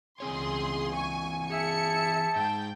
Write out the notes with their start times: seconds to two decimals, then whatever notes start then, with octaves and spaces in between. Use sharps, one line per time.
0.20 C#2 E3 C4 G#4 C#5 C6
0.95 G#5 C#6
1.50 G#4 E5 A5 C#7
2.36 G#2 G#3 G5